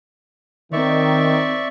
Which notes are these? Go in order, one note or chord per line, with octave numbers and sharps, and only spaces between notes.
D#3 C4 D5 E5 C#6